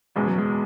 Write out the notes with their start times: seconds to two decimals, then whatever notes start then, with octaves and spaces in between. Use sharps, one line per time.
0.16 F#1 E2 B2 G#3
0.27 F#3
0.38 G#3